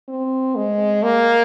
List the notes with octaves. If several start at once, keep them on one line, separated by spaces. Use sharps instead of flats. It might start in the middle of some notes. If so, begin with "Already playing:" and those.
C4
G#3
A#3